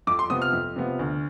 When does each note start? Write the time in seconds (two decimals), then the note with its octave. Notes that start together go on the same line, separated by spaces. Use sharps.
0.07 F2 D6
0.19 C6
0.30 C3 F3 B3 D#6
0.42 F6
0.53 F2
0.76 C3 F3 B3
0.99 D2